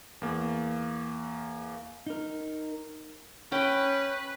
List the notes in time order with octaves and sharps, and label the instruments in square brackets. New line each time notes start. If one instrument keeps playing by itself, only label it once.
[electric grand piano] E2 A#3
[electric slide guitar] D#4 A#4
[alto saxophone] C#4 [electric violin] B4 [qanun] G5